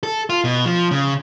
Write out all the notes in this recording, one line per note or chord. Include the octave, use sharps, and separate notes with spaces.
A4
F4
B2
F3
C#3